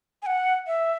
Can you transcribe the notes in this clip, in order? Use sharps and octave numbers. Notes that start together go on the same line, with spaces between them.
G#5
F#5
E5